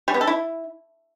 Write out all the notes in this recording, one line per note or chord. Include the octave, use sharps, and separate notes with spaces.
G3
B3
A4
E4